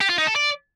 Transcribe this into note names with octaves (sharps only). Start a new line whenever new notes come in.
G4
F4
D#4
A4
D5